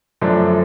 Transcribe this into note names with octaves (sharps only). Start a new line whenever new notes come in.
F#2 D3 F3 A3 D4